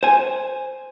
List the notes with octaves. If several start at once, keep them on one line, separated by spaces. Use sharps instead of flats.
C5 G#5